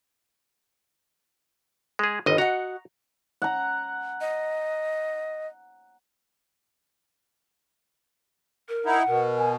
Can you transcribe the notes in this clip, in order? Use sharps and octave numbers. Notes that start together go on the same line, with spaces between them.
G#3 G#4
G1 D#3 D#4 D#5
F#4 D#5 F#5 A#5
F#5 A#5
D#5
A#4
D#4 E4 F#5
B2 A#4
G#5